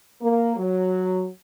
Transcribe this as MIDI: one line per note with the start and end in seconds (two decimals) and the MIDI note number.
0.21 0.55 58
0.56 1.27 54